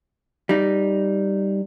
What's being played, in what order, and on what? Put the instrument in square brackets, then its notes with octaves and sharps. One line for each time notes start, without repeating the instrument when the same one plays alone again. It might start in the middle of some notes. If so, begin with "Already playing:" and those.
[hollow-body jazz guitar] G3 D#4